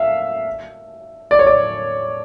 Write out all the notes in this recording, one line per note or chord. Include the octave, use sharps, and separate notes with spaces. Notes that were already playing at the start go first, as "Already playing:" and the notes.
Already playing: E5 F5
D5
C#5
D5